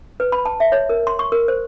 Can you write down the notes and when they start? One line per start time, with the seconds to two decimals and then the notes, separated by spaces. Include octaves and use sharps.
0.20 B4
0.32 B5
0.45 A5
0.60 E5
0.72 C#5
0.89 A#4
1.07 C6
1.19 C#6
1.32 A#4
1.48 C5